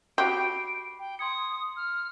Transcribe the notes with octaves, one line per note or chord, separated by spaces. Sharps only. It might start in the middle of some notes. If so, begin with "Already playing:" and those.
F#4 G4 B5 D6 C7 D7
G5
C6 D#6 G#6 C#7
F6